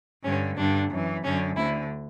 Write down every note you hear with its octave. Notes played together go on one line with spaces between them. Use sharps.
G2 D3 C#4
G2 D3 D4
F#2 E3
F#2 D3 C#4
D2 D3 E4